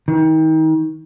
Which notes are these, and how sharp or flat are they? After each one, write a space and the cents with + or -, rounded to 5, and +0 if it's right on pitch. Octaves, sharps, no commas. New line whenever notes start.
D#3 +35